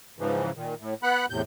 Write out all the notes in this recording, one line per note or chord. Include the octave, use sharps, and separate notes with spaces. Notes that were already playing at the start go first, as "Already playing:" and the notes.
G#2 C#3 E3 F3
A#2 D#3
A2
B3 F#5 B5 F#6
E2 A2 C3 G6